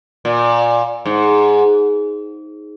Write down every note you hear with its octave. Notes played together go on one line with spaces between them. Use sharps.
A#2
G#2